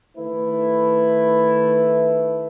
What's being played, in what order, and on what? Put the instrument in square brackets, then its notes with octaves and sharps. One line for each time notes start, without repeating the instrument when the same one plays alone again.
[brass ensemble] D#3 A3 E4 B4